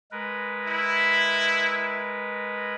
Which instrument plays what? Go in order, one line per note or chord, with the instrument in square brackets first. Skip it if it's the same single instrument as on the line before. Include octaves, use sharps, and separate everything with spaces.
[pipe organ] G#3 A#4 B4
[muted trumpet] E4